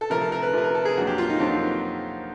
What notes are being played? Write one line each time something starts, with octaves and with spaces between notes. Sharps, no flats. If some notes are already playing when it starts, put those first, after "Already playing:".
A4
C3 F3 A3 A#4
A4
A#4
B4
C3 F3 A3 B4
A#4
A4
G#4
F2 D3 F#3 A#3 F#4
G4
F4
D#4
F2 D3 F#3 A#3 C4